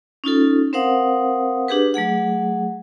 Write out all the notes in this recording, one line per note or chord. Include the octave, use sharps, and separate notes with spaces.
C#4 D#4 F4 A4
C4 A#4 C5 F5 F#5 D#6
D4 G4 G#4 B4
F#3 A3 G#4 F#5